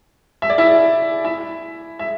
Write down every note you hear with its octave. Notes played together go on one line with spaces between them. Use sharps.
E5
D5
E4 E5
E4 E5
E5